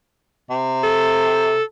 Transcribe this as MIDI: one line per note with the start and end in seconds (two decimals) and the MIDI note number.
0.50 1.59 48
0.83 1.63 69